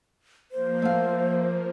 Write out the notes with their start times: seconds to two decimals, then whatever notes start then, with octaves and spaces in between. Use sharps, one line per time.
0.51 F3 A#3 C5
0.82 A3 F5